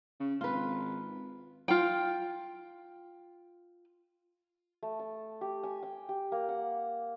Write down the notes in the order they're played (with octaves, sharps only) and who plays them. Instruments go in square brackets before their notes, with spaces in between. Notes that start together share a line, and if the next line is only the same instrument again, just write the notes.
[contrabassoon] C#3
[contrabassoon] G#1 [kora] F4 B4
[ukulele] F4 G5
[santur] A3
A5
G4
G#5
G5
G4
A#3
F#5